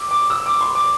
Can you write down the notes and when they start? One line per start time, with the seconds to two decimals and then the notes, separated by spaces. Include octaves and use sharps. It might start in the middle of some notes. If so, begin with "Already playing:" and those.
Already playing: D6 E6
0.11 D6
0.30 E6
0.46 D6
0.61 C6
0.75 D6